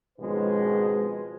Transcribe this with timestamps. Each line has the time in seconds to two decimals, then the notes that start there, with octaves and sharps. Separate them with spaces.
0.19 G#1 B2 F3 G#3 C#4 B4